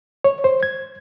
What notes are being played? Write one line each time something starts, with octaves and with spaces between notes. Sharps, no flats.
C#5
C5
G#6